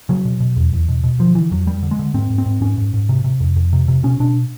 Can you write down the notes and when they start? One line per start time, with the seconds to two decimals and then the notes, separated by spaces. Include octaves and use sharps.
0.09 C#3 F#3
0.25 B2
0.40 B2
0.56 E2
0.73 E2
0.88 B2
1.04 B2
1.19 D3 F3
1.35 D3 E3
1.51 F2 F#3
1.66 F2 G3
1.83 D3
1.91 G#3
1.99 D3
2.14 G#2 C4
2.30 G#2
2.38 C4
2.46 G#2
2.61 G#2 C#4
2.78 G#2
2.94 G#2
3.09 C3
3.24 C3
3.40 F2
3.56 F2
3.73 C3
3.88 C3
4.03 B2 C#4
4.20 B2 D4